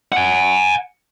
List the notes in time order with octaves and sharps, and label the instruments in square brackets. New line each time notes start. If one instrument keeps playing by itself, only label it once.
[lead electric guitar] F#5 G#5